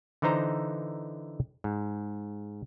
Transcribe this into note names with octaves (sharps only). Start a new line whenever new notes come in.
D3 E3 D#4 C5 A#5
G#2